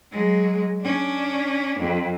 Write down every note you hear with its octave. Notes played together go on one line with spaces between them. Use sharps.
F#3 G#3
C#4 D4
F2